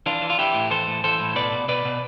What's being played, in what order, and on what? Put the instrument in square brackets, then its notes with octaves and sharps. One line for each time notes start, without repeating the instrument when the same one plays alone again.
[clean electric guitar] E3 D4 F4
E3
F4
E3 E4 G4
A2
E3 A4 C5
A2
E3 A4 C5
A2
B2 B4 D5
B2
B2 B4 D5
B2